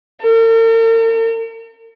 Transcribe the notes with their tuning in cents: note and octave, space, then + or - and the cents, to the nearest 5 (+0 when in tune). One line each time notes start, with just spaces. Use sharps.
A#4 -45